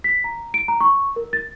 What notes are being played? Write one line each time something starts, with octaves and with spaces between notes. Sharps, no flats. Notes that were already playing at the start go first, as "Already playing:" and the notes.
B6
A#5
D7
A#5
C#6
A#4
A6